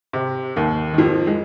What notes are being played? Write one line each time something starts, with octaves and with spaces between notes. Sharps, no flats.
C3
D#2 D#3
D#3
F2 F3
G#3